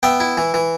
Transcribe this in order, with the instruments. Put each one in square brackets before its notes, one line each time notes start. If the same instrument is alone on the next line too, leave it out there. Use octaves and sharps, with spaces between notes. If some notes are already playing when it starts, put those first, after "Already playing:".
[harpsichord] B3 E5 G5
E4
E3
E3